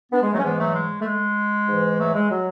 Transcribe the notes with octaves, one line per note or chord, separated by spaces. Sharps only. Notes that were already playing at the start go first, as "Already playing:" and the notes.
B3 D4
G#3
F#3 A3
C#4
G#2 E3 G#3 B3
F#3 A3
G#3
A3
G#3
G#2 E3
F#3 A3
G#3
F#3